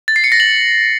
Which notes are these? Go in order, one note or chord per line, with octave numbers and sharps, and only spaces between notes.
A6
C7
C#7
A#6
F#7